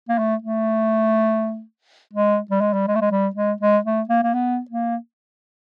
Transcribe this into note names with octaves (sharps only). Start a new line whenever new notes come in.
A#3
A3
A3
G#3
G3
G#3
G3
G#3
A3
G#3
G3
G#3
G#3
A3
A#3
A#3
B3
A#3